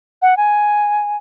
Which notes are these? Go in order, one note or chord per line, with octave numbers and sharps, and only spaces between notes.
F#5
G#5